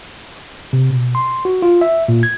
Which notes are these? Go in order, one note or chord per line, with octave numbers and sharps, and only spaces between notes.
C3
B2
C6
F#4
F4
E5
A#2
G#6